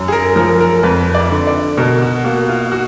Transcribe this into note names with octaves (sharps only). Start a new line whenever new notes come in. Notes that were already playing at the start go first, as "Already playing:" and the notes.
Already playing: F#2
G#4
A#4
F3 A#4
A#4
F2 B4
D5
D3
D5
B2 A#4
F#4
A#3 F#4
F4
F#4